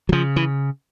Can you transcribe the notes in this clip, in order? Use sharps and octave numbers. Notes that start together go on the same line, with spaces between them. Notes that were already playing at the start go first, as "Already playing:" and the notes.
F#3
C#3 F3
E3